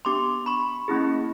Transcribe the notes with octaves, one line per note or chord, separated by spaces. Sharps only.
B3 D4 G4 C6 D6
B5 C#6
A#3 C#4 E4 G#4